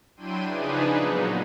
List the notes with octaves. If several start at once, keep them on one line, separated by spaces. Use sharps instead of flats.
F#3 D4 E4 G5 C6 D#7
C#3 F3 D4 D#4 G#4 B4
A#2 F#3 G#3 B3 D#4